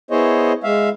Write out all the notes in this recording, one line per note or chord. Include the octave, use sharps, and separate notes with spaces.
B3 E4 G#4 C5 C#5 D#5
G#3 E5 F5